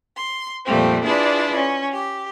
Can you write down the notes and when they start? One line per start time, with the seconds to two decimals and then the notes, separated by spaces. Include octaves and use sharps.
0.17 C6
0.65 F2 A#2 F3 G3 A3 C4
1.04 D4 E4 F4 G#4 B4 D5
1.55 C#4
1.92 G4